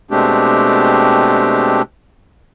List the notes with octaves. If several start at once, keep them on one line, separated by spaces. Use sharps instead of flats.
B2 G#3 A3 C4 D4 G4